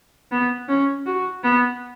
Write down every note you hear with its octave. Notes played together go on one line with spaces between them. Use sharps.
B3
C#4
F#4
B3